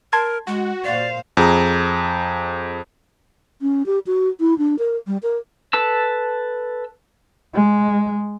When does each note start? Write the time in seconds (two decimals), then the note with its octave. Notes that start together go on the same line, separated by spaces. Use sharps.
0.13 A#4 A5 C6 G#6
0.47 G#3 F#4
0.84 A#2 C5 D5 F5
1.37 F2 G#4 A#5
3.62 C#4
3.86 G4
4.07 F#4
4.40 E4
4.58 D4
4.79 A#4
5.07 G3
5.23 A#4
5.73 A4 B4 A5 E6
7.54 G#3